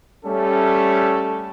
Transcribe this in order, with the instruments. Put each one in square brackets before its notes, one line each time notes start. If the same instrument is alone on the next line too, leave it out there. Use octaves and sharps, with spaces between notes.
[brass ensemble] G3 A3 C#4 [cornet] A4